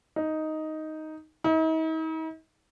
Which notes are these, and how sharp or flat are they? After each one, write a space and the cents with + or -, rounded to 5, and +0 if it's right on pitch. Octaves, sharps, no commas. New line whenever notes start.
D#4 +5
D#4 +45